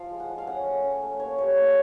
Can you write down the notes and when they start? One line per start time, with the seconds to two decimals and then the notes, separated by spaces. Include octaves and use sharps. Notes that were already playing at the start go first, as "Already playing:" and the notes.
Already playing: F3 F5
0.11 G#3
0.20 F#5
0.29 F3
0.38 F5
0.47 C#4 F#5
0.65 A3
0.83 C#4
1.02 A3
1.20 A#3 C#5
1.38 G3 C#5
1.57 A#3